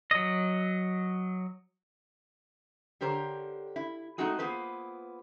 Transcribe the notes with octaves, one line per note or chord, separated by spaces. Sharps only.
F#3 D#5
D3 G4 A#4 C5 C#5
E4
G#3 A3 C4 D#4 F#4 G#4
A#3 B3 F4 G#4 B4 C5